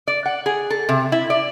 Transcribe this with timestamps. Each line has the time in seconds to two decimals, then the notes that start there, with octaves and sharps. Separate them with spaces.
0.08 D5
0.26 F#5
0.46 G#4
0.70 A4
0.89 C3
1.12 E4
1.30 D5